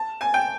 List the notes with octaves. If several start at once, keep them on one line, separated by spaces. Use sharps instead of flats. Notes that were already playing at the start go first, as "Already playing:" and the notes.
Already playing: A5
G#5
G5